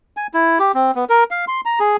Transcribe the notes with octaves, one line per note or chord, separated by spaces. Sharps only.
G#5
E4
G4
C4
B3
A#4
F5
C6
A#5
G#4